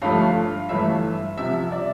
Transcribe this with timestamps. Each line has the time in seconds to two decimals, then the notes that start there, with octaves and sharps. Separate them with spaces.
0.02 G1 G2 F3 A3 F5
0.69 G1 G2 E3 A3 E5
1.37 C2 C3 F3 E5
1.72 D5